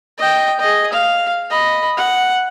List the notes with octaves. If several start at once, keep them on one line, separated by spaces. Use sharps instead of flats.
D#5 G5
G#4 D#5
F5
D#5 B5
F#5